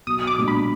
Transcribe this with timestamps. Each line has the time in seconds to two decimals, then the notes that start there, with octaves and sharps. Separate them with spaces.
0.07 B1 D#6
0.27 D6
0.38 A#2 G#3 D4
0.48 B5